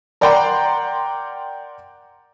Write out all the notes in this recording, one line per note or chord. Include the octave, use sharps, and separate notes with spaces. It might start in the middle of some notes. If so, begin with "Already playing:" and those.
A#4 D5 F#5 G5 A#5 C6